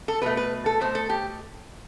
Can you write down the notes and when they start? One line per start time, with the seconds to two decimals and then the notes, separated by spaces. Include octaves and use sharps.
0.08 A4
0.22 B2 A3 B4
0.37 B4
0.66 A4
0.81 B2 A3 C5
0.95 A4
1.10 G4